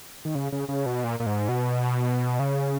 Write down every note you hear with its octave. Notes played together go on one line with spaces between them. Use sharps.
D#3
C#3
C#3
C#3
B2
A#2
A#2
G#2
B2
C#3